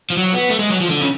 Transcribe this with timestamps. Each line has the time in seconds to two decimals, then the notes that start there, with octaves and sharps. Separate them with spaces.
0.10 F3
0.17 F#3
0.33 B3
0.49 A3
0.59 G#3
0.70 F#3
0.81 F3
0.90 D3
1.01 C#3